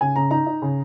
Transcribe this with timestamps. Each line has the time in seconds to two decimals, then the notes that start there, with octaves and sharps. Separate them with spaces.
0.01 C#3 G#5
0.16 C#3 A#5
0.31 D#4 A#5
0.47 D#4
0.62 C#3